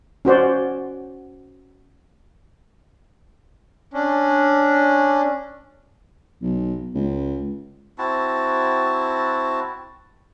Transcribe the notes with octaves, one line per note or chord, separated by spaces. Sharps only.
C#4 F#4 C5 D5
C#4 D4
B1
C#2
C4 E4 F#4 A5